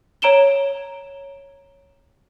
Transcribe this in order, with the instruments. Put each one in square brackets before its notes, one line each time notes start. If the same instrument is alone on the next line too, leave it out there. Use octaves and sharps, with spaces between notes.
[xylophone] C#5 A#5 D7 E7 G7